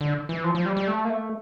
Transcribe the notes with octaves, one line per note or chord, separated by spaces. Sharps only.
D3
E3
F3
F3
G3
G3
A3
A#3
A3